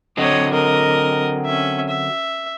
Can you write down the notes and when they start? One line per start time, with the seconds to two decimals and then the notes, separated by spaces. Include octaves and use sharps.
0.17 D3 F#3 C4 C#5 D#5
0.52 A#4 D#5
1.45 C#4 E5
1.89 E5